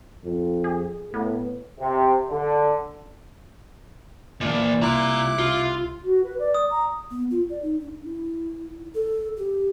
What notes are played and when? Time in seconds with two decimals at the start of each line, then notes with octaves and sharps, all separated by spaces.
0.24 F2
0.64 G#4
1.14 A2 B3
1.80 C3
2.30 D3
4.41 A#2 E3 A#3 D4
4.82 C2 E4 F4 A#5 D6 F#6
5.39 F4
6.03 F#4
6.24 B4
6.39 D5
6.54 D#6
6.70 A#5
7.11 B3
7.31 F4
7.50 D5
7.62 D#4
7.80 D4
8.05 E4
8.94 A4
9.37 G4